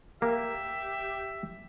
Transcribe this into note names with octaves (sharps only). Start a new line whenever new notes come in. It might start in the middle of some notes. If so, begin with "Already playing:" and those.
A#3 G4 E5